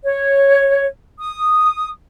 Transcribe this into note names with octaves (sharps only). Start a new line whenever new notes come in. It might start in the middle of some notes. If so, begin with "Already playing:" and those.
C#5
D#6